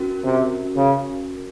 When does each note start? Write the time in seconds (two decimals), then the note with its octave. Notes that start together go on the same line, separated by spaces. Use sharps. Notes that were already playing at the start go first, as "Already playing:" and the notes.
Already playing: C#4 F#4 A#4
0.23 C3
0.76 C#3